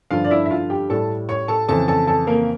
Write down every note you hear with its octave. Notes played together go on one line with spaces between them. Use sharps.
G2 D3 F3 F4 F5
D5
E4 E5
E5
F4 F5
G4 G5
A2 G3 A4 A5
C#5 C#6
A4 A5
F2 C#3 E3 A4 A5
A4 A5
A4 A5
A#3 A#4